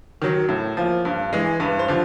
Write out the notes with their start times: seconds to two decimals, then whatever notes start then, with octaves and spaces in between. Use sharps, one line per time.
0.22 D#3 F#3
0.49 A2
0.77 F3 A#3
1.05 G2
1.33 E3 G#3
1.60 G2 B4
1.79 C5
1.88 D3 F3